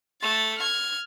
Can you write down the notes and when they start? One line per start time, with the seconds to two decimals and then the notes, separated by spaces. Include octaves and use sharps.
0.22 A3 A6
0.58 F6 G#6